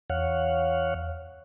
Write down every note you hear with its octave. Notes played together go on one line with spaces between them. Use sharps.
E2 C#5 F5 F#5